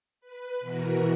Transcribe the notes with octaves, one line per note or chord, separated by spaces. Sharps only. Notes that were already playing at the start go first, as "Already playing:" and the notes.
B4
B2 E3 F#4 A#4